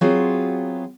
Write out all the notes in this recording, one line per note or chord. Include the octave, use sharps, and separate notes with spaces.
F#3 B3 C4 F4 F#4 G#4